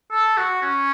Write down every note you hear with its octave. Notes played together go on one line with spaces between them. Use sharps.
A4
F#4
C#4